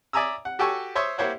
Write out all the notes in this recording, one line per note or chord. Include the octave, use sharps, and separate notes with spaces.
D5 E5 G#5 A#5 D#6 E6
F#5
F#4 G4 A4 G5 G#5 C#6
C5 C#5 E5 C6 C#6 D#6
A#3 E4 G4 C5 C#5 F#5